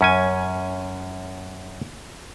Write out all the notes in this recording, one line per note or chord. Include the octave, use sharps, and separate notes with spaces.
F#2 C#4 G#5